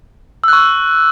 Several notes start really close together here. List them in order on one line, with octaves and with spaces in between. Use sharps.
E6 F#6 C#6